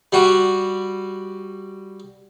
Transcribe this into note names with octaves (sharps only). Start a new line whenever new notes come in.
G3 F#4